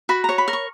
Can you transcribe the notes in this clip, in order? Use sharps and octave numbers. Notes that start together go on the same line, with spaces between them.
F#4 B5
C#5 A#5
B5
A#4
C#6